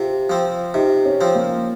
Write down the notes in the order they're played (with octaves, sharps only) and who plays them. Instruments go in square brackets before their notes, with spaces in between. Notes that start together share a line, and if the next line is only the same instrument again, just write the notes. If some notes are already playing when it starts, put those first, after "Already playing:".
Already playing: [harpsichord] C3 [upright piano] F4
[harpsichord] F3 C4
[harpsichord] C3 [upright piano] D#4
[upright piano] C#4
[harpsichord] F3 C4
[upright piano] A#3